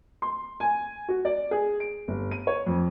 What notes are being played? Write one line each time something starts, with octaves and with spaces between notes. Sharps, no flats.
C6
G#5
F#4
D5
G#4
D7
G1
D#7
C#5
F2